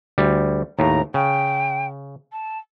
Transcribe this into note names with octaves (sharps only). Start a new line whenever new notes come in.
D2 G3
D#2 A2 A#5
C#3 G5
A5